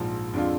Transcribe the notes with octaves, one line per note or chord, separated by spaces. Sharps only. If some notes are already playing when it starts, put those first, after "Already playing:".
Already playing: A#1 G#2 F3
F2 D3 G#3 D4 F4